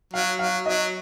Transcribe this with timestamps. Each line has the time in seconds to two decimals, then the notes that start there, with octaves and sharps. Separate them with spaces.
0.13 F#3 F5
0.39 F#3 F5
0.66 F#3 D#5